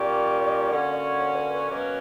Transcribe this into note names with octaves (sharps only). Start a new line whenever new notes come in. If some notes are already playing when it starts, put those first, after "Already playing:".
Already playing: A#2 G3 A#3 C#4 G4 D5
D3 A#3 C#4 F#4
C#5
B4
B4
B2 F#3 A#3 C#4